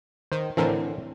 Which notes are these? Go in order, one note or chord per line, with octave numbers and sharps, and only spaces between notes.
D#3 C5
A2 D3 E3 C4 A4 A#4